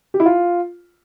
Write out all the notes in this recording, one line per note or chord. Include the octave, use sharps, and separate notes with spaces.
G4
E4
F4